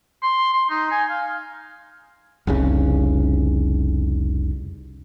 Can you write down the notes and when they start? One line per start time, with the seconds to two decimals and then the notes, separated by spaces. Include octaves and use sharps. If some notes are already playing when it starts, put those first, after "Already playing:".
0.23 C6
0.53 C6
0.70 D#4
0.91 G#5
1.10 F5
2.47 F1 C2 C#3